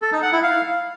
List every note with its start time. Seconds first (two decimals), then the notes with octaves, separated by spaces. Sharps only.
0.02 A4
0.12 D#4
0.22 F#5
0.33 E4
0.43 F5